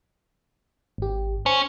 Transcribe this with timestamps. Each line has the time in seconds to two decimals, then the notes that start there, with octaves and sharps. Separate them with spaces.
0.98 G#1 G4
1.46 C#4 C5